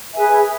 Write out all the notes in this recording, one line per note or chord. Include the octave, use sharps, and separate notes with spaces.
G#4 B4 E5 G#5